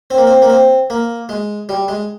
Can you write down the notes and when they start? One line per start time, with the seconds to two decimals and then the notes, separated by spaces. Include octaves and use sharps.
0.10 C4
0.18 A#3
0.27 C4
0.42 A#3
0.50 C4
0.90 A#3
1.29 G#3
1.69 G3
1.88 G#3